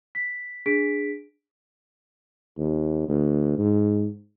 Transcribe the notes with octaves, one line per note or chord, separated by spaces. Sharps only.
B6
D4 G#4 B6 D7
D#2
D2
G#2